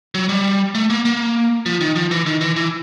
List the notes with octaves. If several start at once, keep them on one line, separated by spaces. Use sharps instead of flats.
F#3
G3
A3
A#3
A#3
F3
D#3
F3
E3
D#3
E3
E3